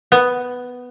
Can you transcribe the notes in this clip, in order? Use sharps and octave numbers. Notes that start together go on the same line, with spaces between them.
B3